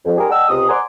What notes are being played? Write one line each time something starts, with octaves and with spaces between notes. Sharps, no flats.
F2
G#3 D4 G4 G#4 A#4
D5 D#5 F#5 G5 A5 E6
C#2 C3 G#3 D#6
D5 F#5 G#5 A#5 C6 D6